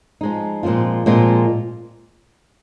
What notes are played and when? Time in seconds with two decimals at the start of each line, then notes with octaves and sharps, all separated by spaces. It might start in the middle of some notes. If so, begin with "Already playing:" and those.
0.21 F3 G#3 D#4
0.63 A#2 F3 G#3 C4 F4
1.06 A#2 F3 G#3 C4 F4